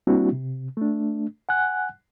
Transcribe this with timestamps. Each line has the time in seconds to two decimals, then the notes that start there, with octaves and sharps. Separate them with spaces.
0.07 G3 A#3 C4 D4 E4 F#4
0.32 C3
0.77 A3 D4
1.49 F#5 G#5 F#6